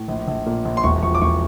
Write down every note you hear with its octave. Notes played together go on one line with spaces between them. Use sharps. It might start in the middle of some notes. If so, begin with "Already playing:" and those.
Already playing: A2
A#1
A#1
A#2
A#1
C6
E1 C#6
F3 C#6
D6
E1 C#6